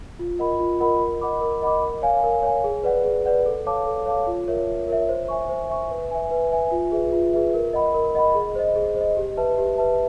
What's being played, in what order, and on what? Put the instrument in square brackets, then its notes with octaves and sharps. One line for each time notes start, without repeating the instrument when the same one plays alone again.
[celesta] F4
A#4 D#5 F#5 B5
F4
A#4 D#5 F#5 B5
A#4
D#5 F#5 B5 D6
A#4
D#5 F#5 B5 D6
A#4
C#5 F5 G#5
A#4
C#5 F5 G#5
G#4
B4 D5 F#5
G#4
B4 D5 F#5
A4
C#5 F5 A5 D6
A4
C#5 F5 A5 D6
F4
A#4 C#5 E5
F4
A#4 C#5 E5
C5
E5 G#5 C#6
C5
E5 G#5 C#6
B4
E5 G#5
B4
E5 G#5
F4
G#4 B4 E5
F4
G#4 B4 E5
A#4
D#5 F#5 B5
A#4
D#5 F#5 B5
G#4
C5 D#5
G#4
C5 D#5
G4
B4 E5 A5
G4
B4 E5 A5